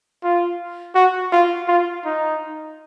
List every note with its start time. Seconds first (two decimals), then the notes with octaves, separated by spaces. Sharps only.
0.23 F4
0.95 F#4
1.32 F4
1.68 F4
2.05 D#4